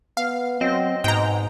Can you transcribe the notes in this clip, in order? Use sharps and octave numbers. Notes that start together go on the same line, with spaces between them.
B3 F5
F#3 C4 D#5
G#2 B2 G5 A#5